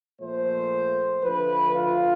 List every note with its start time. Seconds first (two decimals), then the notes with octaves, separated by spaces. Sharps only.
0.21 A#2 F3 A3 C5
1.23 D3 F3 A3 B4
1.74 F4